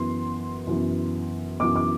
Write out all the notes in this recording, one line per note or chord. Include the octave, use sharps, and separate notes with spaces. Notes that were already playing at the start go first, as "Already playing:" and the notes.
Already playing: F#2 E3 B3 C6
F#2 E3 B3
F#2 E3 B3 D6
D6